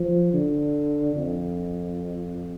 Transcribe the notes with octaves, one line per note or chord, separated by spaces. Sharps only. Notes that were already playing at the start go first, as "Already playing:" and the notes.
Already playing: F3
D3
F2